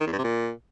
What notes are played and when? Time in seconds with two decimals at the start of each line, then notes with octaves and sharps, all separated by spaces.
0.01 D#3
0.07 E2
0.13 G2
0.18 C3
0.24 A#2